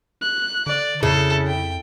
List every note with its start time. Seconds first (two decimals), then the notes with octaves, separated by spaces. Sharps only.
0.21 F#6
0.67 D3 D5
1.03 F2 C#3 E4 A4
1.47 G5